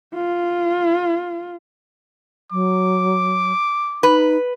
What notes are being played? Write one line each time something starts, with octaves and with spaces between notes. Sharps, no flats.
F4
F#3 D6
D#4 B4